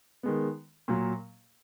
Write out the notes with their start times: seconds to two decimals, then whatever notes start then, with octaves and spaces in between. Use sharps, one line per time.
0.23 D#3 G#3 B3
0.88 A#2 F#3 A#3